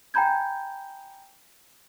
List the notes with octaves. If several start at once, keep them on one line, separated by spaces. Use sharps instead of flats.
G5 G#5 A#5 B5 G6 G#6